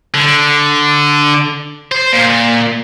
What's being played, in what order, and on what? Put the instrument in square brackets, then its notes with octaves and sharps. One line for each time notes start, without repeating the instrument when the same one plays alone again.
[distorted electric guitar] D3
C5
A#2